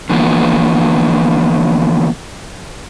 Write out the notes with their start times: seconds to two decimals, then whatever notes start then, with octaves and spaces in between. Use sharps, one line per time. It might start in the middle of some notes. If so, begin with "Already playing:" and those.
0.10 D3 E3 F3 A#3 B3